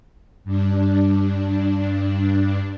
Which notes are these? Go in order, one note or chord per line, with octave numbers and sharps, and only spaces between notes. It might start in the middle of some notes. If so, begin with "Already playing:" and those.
G2 D4